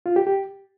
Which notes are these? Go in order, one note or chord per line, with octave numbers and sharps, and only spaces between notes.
F4
G4
G4